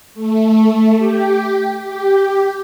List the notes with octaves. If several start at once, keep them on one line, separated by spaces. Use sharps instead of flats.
A3
G4
G4